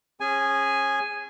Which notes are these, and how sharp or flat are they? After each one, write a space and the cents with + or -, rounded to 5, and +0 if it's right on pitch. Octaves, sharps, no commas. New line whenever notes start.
C#4 -30 G#4 -20 G#5 +0